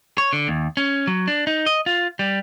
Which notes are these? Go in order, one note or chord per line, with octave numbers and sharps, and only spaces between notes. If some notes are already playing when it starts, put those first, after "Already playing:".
C#5
D3
D#2
C#4
F#3
D4
D#4
D#5
F4
G3